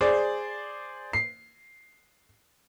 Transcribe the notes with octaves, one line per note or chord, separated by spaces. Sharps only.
G#4 C5 D5
C7